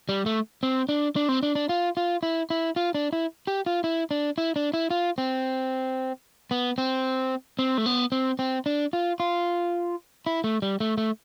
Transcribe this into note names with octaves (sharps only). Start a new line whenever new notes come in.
G3
A3
C4
D4
D4
C4
D4
D4
F4
F4
E4
E4
F4
D4
E4
G4
F4
E4
D4
E4
D4
E4
F4
C4
B3
C4
C4
A3
B3
C4
C4
D4
F4
F4
E4
A3
G3
A3
A3